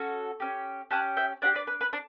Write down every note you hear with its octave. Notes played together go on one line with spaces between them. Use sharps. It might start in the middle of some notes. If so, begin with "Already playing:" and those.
Already playing: C#4 F#4 A4
C#4 G4
C#4 G4 F#5 A5
E5 G5
D4 G4 D5 F#5
B4 D5
B4
B4
D4